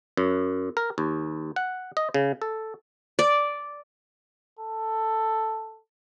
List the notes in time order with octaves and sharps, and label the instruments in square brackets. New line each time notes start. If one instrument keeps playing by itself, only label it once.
[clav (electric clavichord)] F#2
A#4
D#2
F#5
D#5
C#3
A4
[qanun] D5
[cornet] A4